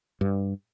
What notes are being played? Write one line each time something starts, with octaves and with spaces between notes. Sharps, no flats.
G2